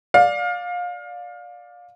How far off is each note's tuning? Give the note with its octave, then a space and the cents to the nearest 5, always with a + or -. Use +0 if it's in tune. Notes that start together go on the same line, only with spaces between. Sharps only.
D5 +0 F5 +25